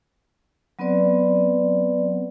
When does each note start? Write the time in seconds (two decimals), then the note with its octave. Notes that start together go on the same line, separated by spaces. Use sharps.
0.79 F#3 B3 C4 B4 D5